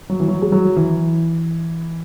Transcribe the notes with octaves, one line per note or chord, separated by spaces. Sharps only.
F#3
E3
F#3
G#3
F#3
E3